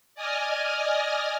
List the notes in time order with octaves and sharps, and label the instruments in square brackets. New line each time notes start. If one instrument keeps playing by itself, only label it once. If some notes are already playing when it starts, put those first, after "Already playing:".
[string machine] D5 D#5 G#5 D#6 F6